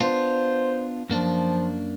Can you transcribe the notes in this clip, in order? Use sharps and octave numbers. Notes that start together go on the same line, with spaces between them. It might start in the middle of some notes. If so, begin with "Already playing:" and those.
B3 D4 F4 C5
F#2 F3 A#3 D4